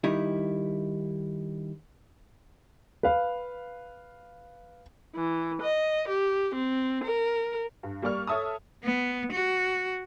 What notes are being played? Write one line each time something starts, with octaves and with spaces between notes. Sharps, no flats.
D#3 G3 D#4 E4
B4 F5
E3
D#5
G4
C4
A#4
G2
G3 A#3 D5 C#6 F6
A4 C#5 E5 A5 D#6
B3
F#4